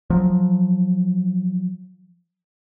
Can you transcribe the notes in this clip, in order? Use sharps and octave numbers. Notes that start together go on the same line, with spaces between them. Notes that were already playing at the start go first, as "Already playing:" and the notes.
F3 F#3